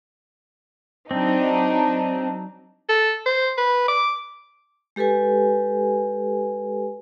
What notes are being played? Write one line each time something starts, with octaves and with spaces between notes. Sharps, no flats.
F#3 C4 D4 D#4
A4
C5
B4
D6
G#3 G4 A4 B4 G#5